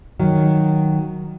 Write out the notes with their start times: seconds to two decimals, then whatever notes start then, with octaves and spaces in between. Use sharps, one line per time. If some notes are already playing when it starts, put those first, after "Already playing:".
0.19 D#3 F#3